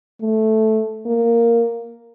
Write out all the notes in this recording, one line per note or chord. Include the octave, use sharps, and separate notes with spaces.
A3
A#3